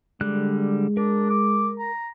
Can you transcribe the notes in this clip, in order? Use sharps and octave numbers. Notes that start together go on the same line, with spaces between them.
D3 G3 G#3 F#6
D4 A#4
D6
A#5